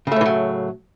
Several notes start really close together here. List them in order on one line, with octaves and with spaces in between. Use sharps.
C#3 A3 A2 E3 F#3